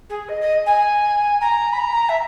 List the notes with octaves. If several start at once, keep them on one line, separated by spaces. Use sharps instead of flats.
G#4
D#5
D#5
G#5
A#5
B5
A#5
E5